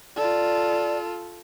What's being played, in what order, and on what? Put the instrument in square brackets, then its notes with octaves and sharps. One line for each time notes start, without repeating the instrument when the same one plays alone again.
[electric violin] F4 A4 [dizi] D5